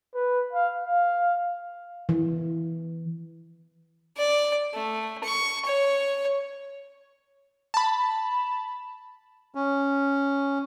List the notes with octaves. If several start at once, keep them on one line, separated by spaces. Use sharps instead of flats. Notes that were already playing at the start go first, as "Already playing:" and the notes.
B4
F5
F5
E3
D5
A3
C#6
C#5
A5 B5
C#4